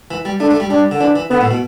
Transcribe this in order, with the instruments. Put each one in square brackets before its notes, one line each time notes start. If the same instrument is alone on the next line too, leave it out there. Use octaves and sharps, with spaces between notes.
[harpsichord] E3
G3
[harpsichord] A3 [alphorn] D4
[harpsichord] A3
G3
[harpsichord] G3 [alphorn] D4
[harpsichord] D3
[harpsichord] E3 [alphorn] D4
[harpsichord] E3
[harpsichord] D3 [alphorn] B3
[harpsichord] A2
B2